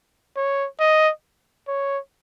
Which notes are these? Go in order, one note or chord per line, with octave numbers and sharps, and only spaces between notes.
C#5
D#5
C#5